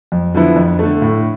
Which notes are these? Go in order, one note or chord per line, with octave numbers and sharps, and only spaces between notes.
F2
D3 F3 B3 E4
F2
D3 A3
A2